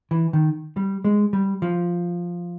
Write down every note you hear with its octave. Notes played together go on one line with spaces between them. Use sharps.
E3
D#3
G3
G#3
G3
F3